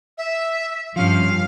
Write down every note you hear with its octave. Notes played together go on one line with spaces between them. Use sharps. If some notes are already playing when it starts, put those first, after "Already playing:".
E5
G2 F3 C#4 F5